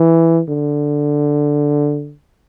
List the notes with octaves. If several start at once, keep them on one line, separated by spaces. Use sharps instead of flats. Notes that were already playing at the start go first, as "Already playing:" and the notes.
Already playing: E3
D3